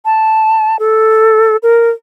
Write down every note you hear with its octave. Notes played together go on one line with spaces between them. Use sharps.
A5
A4
A#4